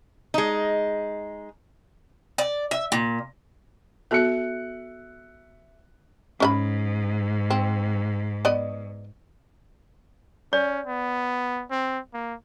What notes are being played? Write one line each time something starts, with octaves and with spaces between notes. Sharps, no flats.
G#3 D#4
D5
E5
A#2
B3 F#4 A4 E5 F#6 C#7
G#2 C#4 D#5 B5
C4
B3 D5 D#5
C#4 D5
B3
C4
A#3